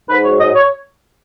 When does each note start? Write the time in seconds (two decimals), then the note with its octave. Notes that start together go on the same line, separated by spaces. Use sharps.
0.08 G#2 B4
0.24 F#3 C#5
0.40 G#2 D#5
0.55 C#5